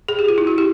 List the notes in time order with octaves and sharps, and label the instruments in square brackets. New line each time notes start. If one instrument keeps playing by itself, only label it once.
[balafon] G#4
G4
F4
E4
F#4
G4